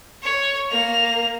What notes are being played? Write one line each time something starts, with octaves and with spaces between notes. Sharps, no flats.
C#5
A#3 F7